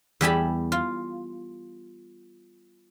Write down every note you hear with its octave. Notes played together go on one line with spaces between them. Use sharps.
E2 G3 G4 G#5 A5 B5
F4